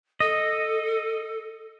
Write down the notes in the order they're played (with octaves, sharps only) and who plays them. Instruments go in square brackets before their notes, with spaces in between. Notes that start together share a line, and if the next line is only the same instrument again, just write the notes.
[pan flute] A4 [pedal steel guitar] D#5